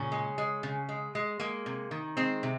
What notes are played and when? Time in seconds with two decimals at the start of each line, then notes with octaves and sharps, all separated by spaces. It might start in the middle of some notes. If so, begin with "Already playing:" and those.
Already playing: A#2 C#3 C#4
0.12 G#3
0.38 G#3
0.63 C#3
0.89 G#3
1.15 G#3
1.40 G#3 A#3
1.66 C3
1.91 D#3
2.17 G#3 C4
2.43 C3